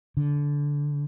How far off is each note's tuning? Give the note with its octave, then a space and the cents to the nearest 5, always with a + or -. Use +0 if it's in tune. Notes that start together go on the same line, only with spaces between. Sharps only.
D3 -15